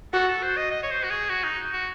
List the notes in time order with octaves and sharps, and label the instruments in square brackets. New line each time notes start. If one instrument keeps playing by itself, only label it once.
[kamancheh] F#4 [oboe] A4
[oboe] A4
C5
D#5
D#5
C#5
C5
F#4
G#4
F#4
D#4
F#4